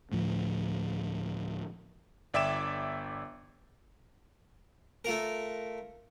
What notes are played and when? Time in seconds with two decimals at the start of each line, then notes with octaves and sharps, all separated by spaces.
0.12 D2 A2 F3
2.34 G1 D5 E5 G5 D6 E7
5.05 A3 F4 A#4